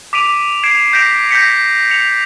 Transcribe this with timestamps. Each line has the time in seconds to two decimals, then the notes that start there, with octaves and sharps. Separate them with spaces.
0.13 D6 B6 D7 D#7 F7
0.63 G#6 C7 D7 E7 F7
0.93 G6 A#6 B6 D7 E7 F7
1.31 G6 A#6 B6 C#7
1.90 C#7 F7